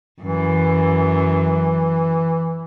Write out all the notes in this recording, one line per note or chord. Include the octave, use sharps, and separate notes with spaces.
F#2 E3